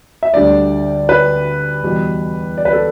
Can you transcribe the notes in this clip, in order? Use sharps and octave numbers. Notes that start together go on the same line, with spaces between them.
E5
D2 D3 G3 D5
B4
E2 B2 G3
D5
B4
A4